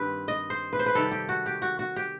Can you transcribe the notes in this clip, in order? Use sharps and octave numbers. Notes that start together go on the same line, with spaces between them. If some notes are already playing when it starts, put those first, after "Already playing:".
Already playing: G2 D#3 C4 G4 B4
D#5
C5
B4
C5
B4
C3 D#3 G3 A4
G4
F#4
G4
F#4
F#4
G4